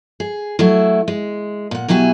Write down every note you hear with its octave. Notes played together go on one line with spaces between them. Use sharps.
G#4
F#3 A3 E4
G#3
A#2 F#5
B2 F#3 E4 G4 G#5